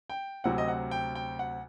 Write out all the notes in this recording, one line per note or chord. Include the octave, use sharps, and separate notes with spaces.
G5
D2 C3 F#3 F#5
D#5
F#5
G5
G5
F#5